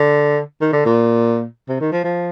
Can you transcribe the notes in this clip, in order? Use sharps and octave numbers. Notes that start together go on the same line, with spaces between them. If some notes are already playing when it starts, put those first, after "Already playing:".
Already playing: D3
D#3
D3
A#2
C3
D#3
F3
F3